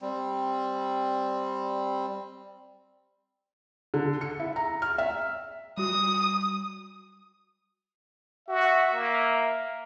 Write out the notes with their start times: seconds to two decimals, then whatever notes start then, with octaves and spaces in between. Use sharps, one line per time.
0.02 G3 C4
3.94 D3
4.21 C#7
4.40 E4
4.56 A#5
4.82 F6
4.98 E5
5.77 G3 F#4 D#6
8.48 F#4 E5
8.93 A#3